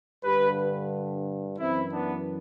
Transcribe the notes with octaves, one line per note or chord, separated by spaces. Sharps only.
G2 D3 G4 B4
F#2 E3 C4 E4
B3 D4